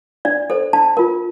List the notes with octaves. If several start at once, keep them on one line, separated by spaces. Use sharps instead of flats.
D4 D5
A4 C5
D4 A5
F4 A#4